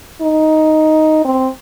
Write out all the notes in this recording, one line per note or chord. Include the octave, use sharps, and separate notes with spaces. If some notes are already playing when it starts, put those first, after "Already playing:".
D#4
C4